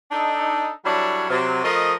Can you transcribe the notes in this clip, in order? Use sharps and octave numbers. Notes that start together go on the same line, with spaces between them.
D4 D#4 A4
F#3 G3 D4 E4 A4 C#5
C3 F#3
F3 A3 A#4 D#5